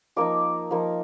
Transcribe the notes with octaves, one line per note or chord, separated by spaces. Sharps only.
F3 A#3 D#4 D6
F3 A#3 D#4